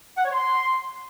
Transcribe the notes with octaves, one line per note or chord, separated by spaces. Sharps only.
F#5
C#5
C6